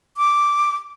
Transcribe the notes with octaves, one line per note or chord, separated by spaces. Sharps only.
D6